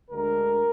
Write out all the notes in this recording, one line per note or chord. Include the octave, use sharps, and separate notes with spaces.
D2 D3 G#3 A#4